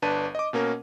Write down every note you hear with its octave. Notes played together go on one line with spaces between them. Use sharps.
G1 D4 B4 A5 D#7
D#5 D6
B2 A#3 C#4 A#4